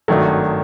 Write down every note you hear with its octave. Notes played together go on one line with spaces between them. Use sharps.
G#1 G2 D#3 F#3 A3